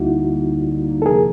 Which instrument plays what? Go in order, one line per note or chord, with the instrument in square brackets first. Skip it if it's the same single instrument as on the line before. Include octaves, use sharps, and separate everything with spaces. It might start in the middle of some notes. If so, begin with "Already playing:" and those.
Already playing: [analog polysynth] D2 D3 G3 A#3 D#4 [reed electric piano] E4 F#4
[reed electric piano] A4
[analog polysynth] C3 F3 A#3 [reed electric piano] G#4 A#4